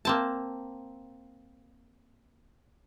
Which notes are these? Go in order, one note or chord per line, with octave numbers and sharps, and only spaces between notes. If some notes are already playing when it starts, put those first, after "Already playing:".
A#3 C4 A5